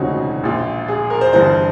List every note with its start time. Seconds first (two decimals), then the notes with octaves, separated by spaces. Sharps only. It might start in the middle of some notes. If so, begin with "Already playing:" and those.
Already playing: E1 D2 C#3 F3 C4 C#4 D#4 F#4
0.43 A#1 A#2 F3
0.88 G#4
1.10 A#4
1.21 C5
1.33 G1 G2 E3 C5